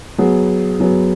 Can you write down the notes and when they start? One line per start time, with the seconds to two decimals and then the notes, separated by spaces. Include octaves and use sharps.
0.18 F#3 B3 G#4
0.80 F#3 B3 G#4